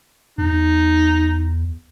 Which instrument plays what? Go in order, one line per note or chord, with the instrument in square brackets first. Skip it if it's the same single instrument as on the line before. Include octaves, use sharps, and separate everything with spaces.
[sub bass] E2 [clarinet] D#4